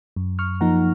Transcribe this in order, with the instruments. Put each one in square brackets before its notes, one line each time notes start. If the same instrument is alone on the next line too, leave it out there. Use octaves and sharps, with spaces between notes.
[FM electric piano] F#2
C#6 F6
F3 A#3 D#4 F#5 A#5